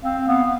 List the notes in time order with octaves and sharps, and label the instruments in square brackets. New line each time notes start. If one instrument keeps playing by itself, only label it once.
[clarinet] C4 [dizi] F5
[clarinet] B3 [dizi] F5